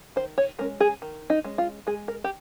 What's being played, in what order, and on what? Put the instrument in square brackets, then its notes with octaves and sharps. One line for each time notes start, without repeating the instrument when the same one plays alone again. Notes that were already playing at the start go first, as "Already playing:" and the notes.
[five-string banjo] D#3 C5
C#5
G#3 C#4 A#4
G#4
D#3
D#4
G#3 C#4
F4
G#3 G#4
A#4
G4